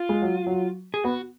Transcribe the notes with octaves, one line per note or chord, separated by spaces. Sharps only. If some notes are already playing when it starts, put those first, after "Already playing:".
Already playing: F4
G#3
F#3
F#3
G#4
B3 F#4